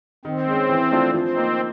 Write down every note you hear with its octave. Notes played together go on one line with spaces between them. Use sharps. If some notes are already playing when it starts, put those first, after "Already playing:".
D#3 C4
G#3 C#4
E3
A3 D4 F4
F3 C4
A#3 D#4